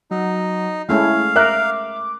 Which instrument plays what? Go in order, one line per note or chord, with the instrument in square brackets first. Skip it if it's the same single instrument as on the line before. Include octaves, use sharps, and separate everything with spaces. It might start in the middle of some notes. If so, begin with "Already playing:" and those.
[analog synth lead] F#3 [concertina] D#4
[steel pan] G#3 A3 C#4 [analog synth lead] E4 [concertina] F5
[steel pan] A#4 [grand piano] E5 F#6 [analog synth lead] D6